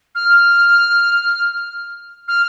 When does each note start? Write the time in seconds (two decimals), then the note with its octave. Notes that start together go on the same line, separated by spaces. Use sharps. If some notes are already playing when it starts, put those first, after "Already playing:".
0.15 F6
2.28 F6